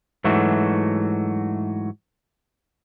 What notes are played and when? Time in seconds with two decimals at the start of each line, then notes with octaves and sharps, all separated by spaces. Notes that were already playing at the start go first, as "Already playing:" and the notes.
0.24 G#2 E3 F#3 A3 F#4